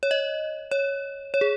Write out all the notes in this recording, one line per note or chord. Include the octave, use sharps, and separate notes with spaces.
C#5
D#5
C#5
C#5
G#4